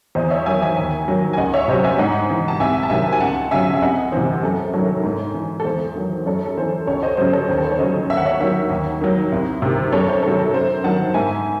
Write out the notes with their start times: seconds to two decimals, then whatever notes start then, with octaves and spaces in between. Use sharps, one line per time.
0.15 E2 C5 D#5
0.30 C#5 E5
0.46 D#3 F#3 E5 G#5
0.62 E5 G#5
0.77 D#2
1.08 D#3 F#3
1.33 G#5
1.37 C#2 D#5 F#5
1.54 C#5 E5
1.68 C3 F#3 C5 D#5
1.84 E5 G#5
1.98 G#2 D#5 F#5
2.30 E3
2.48 A5
2.60 C2 E5 G#5
2.83 A5
2.90 C3 D#3 F#3 E5 G#5
3.12 G#5
3.20 C#2 F#5 A5
3.51 C#3 F#3 E5 G#5
3.74 E5
3.81 C2 D#5 F#5
4.12 C3 E3 C5
4.43 F#2 A4
4.73 D#3 F#3 A4 C#5
5.04 G#2
5.34 E3
5.60 A4
5.65 E2 C5
5.96 D#3 F#3
6.26 F#2 A4 C#5
6.45 A4
6.57 E3 C5
6.87 C#2 A4 C#5
7.03 C5 D#5
7.17 C#3 F#3 C5 D#5
7.33 A4 C#5
7.48 D#2 C5
7.58 A4
7.64 C5
7.72 C#5
7.79 C#3 F#3 C5 D#5
8.09 D#2 E5
8.17 F#5
8.25 C#5 E5
8.40 D#3 F#3 C#5 E5
8.70 D#2
9.01 D#3 F#3
9.32 C2
9.62 C3 D#3
9.92 F#2 A4 C#5
10.08 C5
10.23 D#3 F#3 A4
10.39 A4
10.53 F#2 C5
10.84 D#3 F#3 F#5 A5
11.14 G#2 E5 G#5